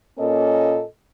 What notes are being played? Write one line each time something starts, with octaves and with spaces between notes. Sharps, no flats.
A#2 A#3 C#4 A4 D#5